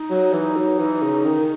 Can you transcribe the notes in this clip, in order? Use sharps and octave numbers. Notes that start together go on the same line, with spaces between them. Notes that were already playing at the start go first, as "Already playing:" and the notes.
Already playing: D#4
F#3
E3
F#3
E3
C#3
D#3